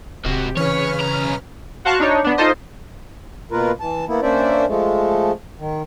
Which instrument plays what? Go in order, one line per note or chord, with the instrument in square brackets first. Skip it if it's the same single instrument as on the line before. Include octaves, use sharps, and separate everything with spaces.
[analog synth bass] D1 [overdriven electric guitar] G#2 F#4 [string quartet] C3 G4
[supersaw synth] C#3 C#4 F6 [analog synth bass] E3 [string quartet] B4 [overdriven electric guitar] C#5
[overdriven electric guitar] B1 A#5
[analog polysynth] F#4 C5 F5 A5 C#6 F#6
D4 D#4 C#5
B3 D4
D#4 F4 A4 C5 D#5
[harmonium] B2 A#3 F4 A#4 B4
E3 A5
A#3 B3 E4
A#3 C#4 D4 C5 D5 E5
F3 G#3 A3
D#3